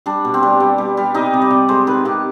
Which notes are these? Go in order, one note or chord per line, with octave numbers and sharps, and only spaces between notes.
G3 D4
B2
C4
G3
G3
G3
G3
C3 D#4
C3
D5
C3
G#3 C5
D#3 B4
C3 G4